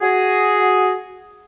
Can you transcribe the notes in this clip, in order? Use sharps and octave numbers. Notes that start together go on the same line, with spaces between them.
F#4 G#4